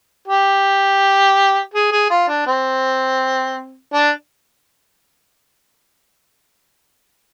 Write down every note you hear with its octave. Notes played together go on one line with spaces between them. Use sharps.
G4
G#4
G#4
F4
D4
C4
D4